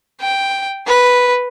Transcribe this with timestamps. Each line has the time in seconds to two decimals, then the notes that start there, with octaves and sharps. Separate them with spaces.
0.21 G5
0.87 B4